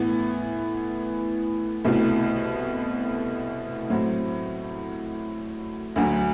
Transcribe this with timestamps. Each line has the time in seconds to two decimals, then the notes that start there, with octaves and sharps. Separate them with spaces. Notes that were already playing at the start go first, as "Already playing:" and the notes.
Already playing: A2 E3 B3
1.85 C2 B2 A3 E4
3.90 A2 F#3 C4
5.96 D2 D3 F#3